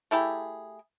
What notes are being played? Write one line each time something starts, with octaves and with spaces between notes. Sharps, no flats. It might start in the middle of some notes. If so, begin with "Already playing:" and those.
A3 E4 G4 G#4